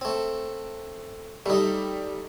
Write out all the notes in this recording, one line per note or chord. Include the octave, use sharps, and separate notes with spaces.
A3 C4
G3 A3 D#4